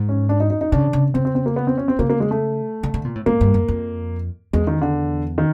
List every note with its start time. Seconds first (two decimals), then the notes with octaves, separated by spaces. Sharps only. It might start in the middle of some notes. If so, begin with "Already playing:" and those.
Already playing: G#2
0.09 C#4
0.29 D4
0.40 D#4
0.50 D#4
0.61 D#4
0.72 C#3 D4
0.93 C#3
1.14 C#3 C4
1.25 C4
1.35 C4
1.46 A#3
1.56 B3
1.67 C4
1.78 C#4
1.88 C4
1.99 C#3 A#3
2.10 A#3
2.20 G#3
2.31 A3
2.83 D3
2.94 D3
3.05 A#2
3.15 A2
3.26 G#2 A#3
3.41 G2
3.54 F#2
3.68 F2
4.53 E2 G#3
4.67 D#3
4.82 D3
5.38 D#3